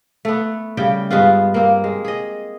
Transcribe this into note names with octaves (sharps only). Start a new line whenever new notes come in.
A3 B3
C#3 G3 G5
G2 G#3 B3 F4
A#3 C4
G#3
G#4 D#5